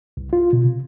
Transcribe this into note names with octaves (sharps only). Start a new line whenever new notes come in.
C2
F4
B2
C3